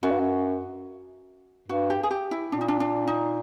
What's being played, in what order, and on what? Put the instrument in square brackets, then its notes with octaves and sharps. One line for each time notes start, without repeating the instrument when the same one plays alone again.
[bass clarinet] F#2 [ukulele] F#4
[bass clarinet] G2
F#2
[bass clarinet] G2 [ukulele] F#4
[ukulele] G4
G#4
G4
E4
[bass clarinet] A#2 [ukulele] D4
[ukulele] D#4
D4
D4
D#4